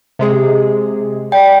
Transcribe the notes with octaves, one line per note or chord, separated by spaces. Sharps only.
C3 G#3 G#4
D5 G5